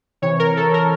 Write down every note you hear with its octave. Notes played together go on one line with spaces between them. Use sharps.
C3 E3 C#5
A#4
A4
A#4